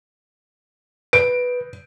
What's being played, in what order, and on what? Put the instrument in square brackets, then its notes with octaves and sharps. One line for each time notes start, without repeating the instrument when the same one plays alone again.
[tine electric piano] B4 [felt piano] D7